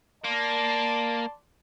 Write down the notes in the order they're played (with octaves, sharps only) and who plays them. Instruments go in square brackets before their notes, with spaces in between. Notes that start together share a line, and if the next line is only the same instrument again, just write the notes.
[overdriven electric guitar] A#3 [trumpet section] D5 A5 C6